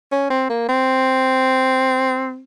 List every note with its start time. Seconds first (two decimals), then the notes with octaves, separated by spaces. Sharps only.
0.12 C#4
0.30 C4
0.50 A#3
0.69 C4